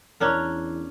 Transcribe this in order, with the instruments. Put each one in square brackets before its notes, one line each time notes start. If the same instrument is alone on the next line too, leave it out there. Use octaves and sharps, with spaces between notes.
[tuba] E2 [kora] C#4 D4 A#4